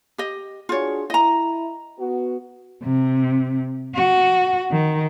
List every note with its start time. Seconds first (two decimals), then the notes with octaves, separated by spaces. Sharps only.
0.18 G4 D#5
0.69 D4 F4 F#4 G#4 C#5
1.10 E4 D#5 A#5
1.99 B3 F#4
2.84 C3
3.95 F#4
4.72 D#3